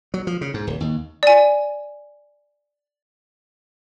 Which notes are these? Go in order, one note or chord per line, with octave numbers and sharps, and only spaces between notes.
F#3
F3
C#3
G#2
D1
D#2
D5 G#5